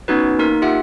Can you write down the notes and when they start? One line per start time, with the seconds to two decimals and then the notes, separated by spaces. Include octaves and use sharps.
0.08 B3 C#4 D#4 F#4 B4
0.39 A#3 D#4 A#4
0.62 F4 G4 E5 F#5